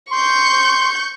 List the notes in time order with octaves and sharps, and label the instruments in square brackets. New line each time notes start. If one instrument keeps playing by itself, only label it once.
[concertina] C6 [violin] C#6 G6